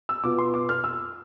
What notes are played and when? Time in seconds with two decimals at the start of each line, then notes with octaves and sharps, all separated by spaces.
0.09 E6
0.23 B2 B3 F4 D6
0.38 C6
0.54 D6
0.69 F6
0.84 E6